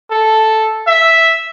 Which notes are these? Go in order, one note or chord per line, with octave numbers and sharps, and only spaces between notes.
A4
E5